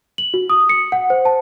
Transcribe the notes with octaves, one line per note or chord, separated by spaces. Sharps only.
F#7
F#4
D#6
C#7
F#5
C5
A5